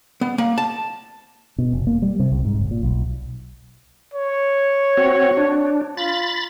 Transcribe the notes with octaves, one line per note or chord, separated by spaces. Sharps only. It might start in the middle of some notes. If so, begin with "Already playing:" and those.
B3
A#3
A5
B2
F1
A#3
G3
C3
C2
G#2
F#1
A#2
B1
C#5
C4 F#4
D4
F4 B5 A6